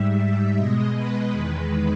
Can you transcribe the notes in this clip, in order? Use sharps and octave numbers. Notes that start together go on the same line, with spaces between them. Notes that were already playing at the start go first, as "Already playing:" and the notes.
Already playing: G#2 G3 E5
B2 G#3 D#5
B4
E2 D#3 G#3 B4